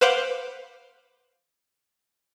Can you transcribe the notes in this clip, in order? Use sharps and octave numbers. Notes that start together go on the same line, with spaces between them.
B4 C5 F5 F#5 D6 G6